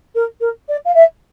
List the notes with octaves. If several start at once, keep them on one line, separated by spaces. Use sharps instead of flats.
A#4
A#4
D5
F5
E5